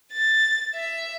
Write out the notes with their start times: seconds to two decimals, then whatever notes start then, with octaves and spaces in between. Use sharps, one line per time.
0.13 A6
0.75 E5